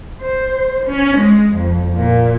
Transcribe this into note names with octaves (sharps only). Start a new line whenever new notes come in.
C5
C#4
G#3
F2
A#2